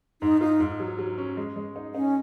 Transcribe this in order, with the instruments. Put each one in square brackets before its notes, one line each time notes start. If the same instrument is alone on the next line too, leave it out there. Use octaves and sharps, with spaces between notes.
[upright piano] G#2 [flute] D#4
[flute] D#4 [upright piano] F4
[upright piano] G#2
F#3
F#3
C#4
G#3
G#3
D#4
[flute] C#4 [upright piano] D#4